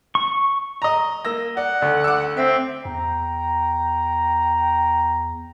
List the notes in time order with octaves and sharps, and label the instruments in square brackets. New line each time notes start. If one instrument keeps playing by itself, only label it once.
[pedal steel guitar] C#6
[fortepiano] D#5 A#5
[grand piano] A#3 E6 A#6
[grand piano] D5 [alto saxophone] F#5
[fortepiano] D2
[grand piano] D6 E6
[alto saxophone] C4 [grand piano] E5
[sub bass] E2 [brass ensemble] G5 A#5